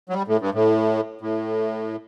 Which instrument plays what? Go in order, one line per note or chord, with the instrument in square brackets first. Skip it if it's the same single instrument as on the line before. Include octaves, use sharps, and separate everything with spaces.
[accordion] F#3
G3
A2
G2
A2
A2